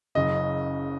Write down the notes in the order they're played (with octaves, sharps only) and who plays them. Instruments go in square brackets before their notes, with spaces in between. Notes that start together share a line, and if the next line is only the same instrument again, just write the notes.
[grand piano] F#1 F#2 C#3 D#5